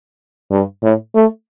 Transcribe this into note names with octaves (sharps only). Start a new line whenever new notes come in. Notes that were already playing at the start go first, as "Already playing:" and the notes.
G2
A2
A3